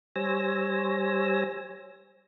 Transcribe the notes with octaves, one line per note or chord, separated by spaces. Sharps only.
G3 C5 C#5 G#5 E6 A#6